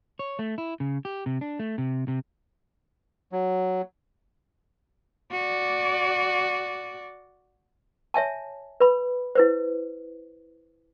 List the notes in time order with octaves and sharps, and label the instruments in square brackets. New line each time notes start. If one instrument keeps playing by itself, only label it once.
[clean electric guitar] C#5
A3
E4
C#3
G4
C3
D4
A3
C3
C3
[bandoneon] F#3
[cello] F#4 D5
[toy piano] C#5 E5 G#5 A5
B4 B5
E4 B4 C5